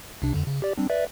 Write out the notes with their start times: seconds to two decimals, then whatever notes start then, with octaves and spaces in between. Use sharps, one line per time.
0.22 C2 C3 D4
0.34 F2 D3
0.47 C#3
0.62 G4 D5
0.78 G3 C4 D4
0.90 B4 D5 E5